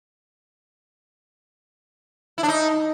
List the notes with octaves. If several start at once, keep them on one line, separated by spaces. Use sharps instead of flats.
E4
D4
D#4